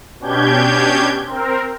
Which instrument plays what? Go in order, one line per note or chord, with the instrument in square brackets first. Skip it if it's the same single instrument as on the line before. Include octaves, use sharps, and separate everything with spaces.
[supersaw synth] B2 C#4 D4 G4 G6 G#6
C4 A#4